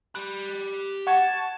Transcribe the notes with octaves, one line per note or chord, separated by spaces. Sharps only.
G4 B5 F#6
F#5 A5 C#6 G#6